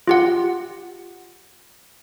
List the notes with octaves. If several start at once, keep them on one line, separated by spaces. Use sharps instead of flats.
F4 G4 F#5